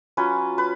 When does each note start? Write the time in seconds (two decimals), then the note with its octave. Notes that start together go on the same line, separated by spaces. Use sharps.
0.17 F#3 C#4 F4 B4
0.58 B4